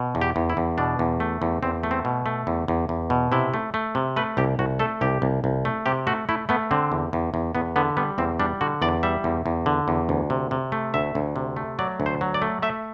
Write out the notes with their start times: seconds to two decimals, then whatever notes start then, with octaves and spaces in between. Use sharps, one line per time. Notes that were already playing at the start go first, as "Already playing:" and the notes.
Already playing: B2
0.15 E2
0.21 G4
0.36 E2
0.50 E4
0.57 E2
0.78 B2 D4
0.99 E2
1.20 A3
1.42 E2
1.63 E2 C4
1.83 A3
1.91 C4
2.05 B2
2.26 A3
2.47 E2
2.68 E2
2.89 E2
3.10 B2
3.32 C3 E4
3.54 A3
3.74 A3
3.95 C3
4.16 A3 B4
4.37 C2 G4
4.59 C2 F#4
4.79 A3 A4
5.01 C2 G4
5.22 C2
5.44 C2
5.65 A3
5.86 C3 G4
6.07 A3 F#4
6.29 A3 E4
6.49 A3 B3
6.71 D3 C4
6.92 E2
7.13 E2
7.34 E2
7.55 E2 B3
7.76 D3 B3
7.97 G3 B3
8.18 E2 C4
8.40 G3 D4
8.61 D3 F#4
8.82 E2 D5
9.03 G3 E5
9.24 E2
9.46 E2
9.66 D3
9.88 E2
10.09 D2
10.30 C3
10.51 C3
10.72 A3
10.94 D2 E5
11.15 D2
11.36 C3
11.56 A3
11.79 F#3 D5
12.00 D2
12.06 C5
12.21 F#3
12.34 D5
12.42 A3
12.62 A3 E5